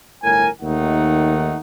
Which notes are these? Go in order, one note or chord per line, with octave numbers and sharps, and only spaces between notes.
G1 A2 A#4 G#5
D#2 D#3 A3 D#4 F#5